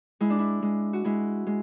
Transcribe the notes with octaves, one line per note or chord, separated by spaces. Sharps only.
G#3 E4
D4
E4
G#3
F#4
G#3 E4
G#3